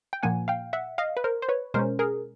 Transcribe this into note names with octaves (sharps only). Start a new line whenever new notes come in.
G5
A#2 F3 A#3 F#5 G#5
F5 G5
E5 F#5
D#5 F5
B4
A#4 C5
C5
B4 C#5
B2 G#3 C#4 A#4 C5
G#4 A#4